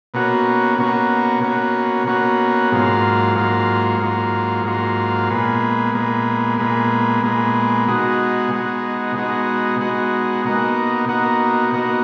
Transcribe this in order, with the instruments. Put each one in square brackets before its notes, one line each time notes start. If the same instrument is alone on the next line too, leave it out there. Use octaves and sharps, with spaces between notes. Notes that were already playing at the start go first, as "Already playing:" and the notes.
[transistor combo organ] B2 A#3 C#4 F#4
B2 A#3 C#4 F#4
B2 A#3 C#4 F#4
B2 A#3 C#4 F#4
G#2 F#3 A#3 F4
G#2 F#3 A#3 F4
G#2 F#3 A#3 F4
G#2 F#3 A#3 F4
A#2 G#3 B3
A#2 G#3 B3
A#2 G#3 B3
A#2 G#3 B3
B2 G#3 D#4 F#4
B2 G#3 D#4 F#4
B2 G#3 D#4 F#4
B2 G#3 D#4 F#4
B2 A#3 D#4 F#4
B2 A#3 D#4 F#4
B2 A#3 D#4 F#4